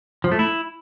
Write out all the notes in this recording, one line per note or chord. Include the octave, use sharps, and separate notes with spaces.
F3
A3
E4